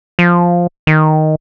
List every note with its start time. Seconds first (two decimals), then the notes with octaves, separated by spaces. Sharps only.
0.19 F3
0.87 D#3